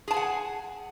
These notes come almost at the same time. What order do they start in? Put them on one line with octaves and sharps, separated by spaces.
G#4 A5 G#5 F#5